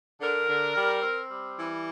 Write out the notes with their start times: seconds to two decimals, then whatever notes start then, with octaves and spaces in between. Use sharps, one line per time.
0.20 D3 A#4
0.48 D3
0.75 G3
1.02 C4
1.29 G3
1.57 E3